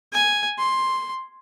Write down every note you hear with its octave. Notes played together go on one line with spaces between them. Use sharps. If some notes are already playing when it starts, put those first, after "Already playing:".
G#5
C6